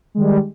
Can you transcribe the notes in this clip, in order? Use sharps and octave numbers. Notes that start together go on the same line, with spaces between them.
D#3 G3 G#3